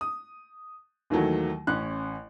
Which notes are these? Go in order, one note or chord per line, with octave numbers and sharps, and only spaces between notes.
D#6
D#2 D#3 E3 F#3 A3
A1 C#4 F#6